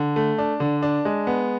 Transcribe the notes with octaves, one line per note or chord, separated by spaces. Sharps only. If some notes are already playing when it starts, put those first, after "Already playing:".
Already playing: D3
A3
D4
D3
D4
G#3
B3